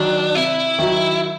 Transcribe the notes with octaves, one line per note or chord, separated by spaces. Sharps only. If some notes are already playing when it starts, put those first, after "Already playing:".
Already playing: D#3 F#3 D4
C3 E4
D#3 F#3